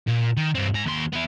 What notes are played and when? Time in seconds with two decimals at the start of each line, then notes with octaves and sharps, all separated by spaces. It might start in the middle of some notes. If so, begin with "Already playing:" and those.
0.07 A#2
0.37 D#3
0.55 G2 C4
0.74 G#2 A#5
0.86 D#2 C6
1.13 B3 E4